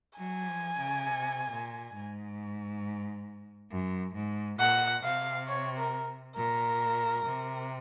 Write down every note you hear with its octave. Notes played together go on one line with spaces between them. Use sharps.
F#3 G#5
F3
C#3
C3
A#2
G#2
F#2
G#2
A#2 F#5
C3 F5
C#5
A#4
A#2 A#4
C3